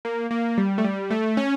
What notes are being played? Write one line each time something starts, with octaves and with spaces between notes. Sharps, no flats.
A#3
A#3
G3
A3
G3
A3
C#4